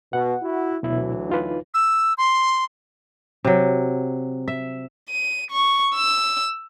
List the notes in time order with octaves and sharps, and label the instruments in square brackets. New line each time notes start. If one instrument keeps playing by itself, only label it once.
[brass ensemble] B2 [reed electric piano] F#5
[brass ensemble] E4 F#4
[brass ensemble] D2 E3 F#3 [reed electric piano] B2 E4
[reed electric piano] D#4 F4 B4
[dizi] E6
C6
[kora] C3 F#3
E5
[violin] D#7
C#6
E6